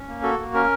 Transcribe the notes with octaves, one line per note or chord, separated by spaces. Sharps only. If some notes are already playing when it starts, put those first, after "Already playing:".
Already playing: C#4
A#3
F#4 A4
A#3
C#4 A#4